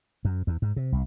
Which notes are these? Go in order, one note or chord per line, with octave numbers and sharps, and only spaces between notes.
F#2
E2
G#2
C3
C2